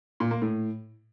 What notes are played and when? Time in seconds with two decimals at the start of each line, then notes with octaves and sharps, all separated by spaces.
0.20 A#2
0.31 A#3
0.42 A2